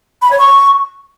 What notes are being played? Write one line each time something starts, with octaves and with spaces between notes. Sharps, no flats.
B5
C#5
C#6